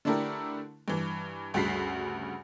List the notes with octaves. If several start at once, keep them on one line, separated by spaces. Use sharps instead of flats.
D3 A3 D4 E4 G4 A#4
G2 E3
D2 G2 C#3 F#4 B6 C7